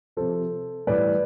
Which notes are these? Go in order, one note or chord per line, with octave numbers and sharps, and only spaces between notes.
C3 F3 A4 C5
A2 E3 G3 B4 D5